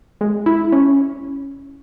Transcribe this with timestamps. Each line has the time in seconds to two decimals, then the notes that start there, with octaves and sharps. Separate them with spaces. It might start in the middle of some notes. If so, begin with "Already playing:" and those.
0.21 G#3
0.46 E4
0.72 C#4